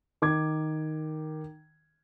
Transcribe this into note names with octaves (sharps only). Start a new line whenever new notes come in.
D#3 D6 G#6